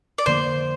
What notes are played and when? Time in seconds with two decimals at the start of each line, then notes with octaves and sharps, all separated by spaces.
0.18 D5
0.26 F2 D3 F3 A#3 C5